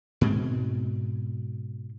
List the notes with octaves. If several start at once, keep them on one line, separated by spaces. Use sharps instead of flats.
G#2 B2 G#3 C4